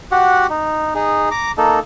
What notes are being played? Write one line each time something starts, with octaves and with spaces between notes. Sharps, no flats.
F#4 G4 F#5
D#4
D#4 G#4
A#5 D6
A#3 D#4 A4